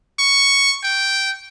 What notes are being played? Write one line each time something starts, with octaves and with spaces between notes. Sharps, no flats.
C#6
G5